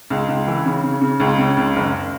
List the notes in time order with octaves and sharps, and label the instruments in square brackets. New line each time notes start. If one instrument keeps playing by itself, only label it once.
[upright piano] C#2
C#2
E3
C#3
C#3
C#3
C#2
C#3
C#2
F#1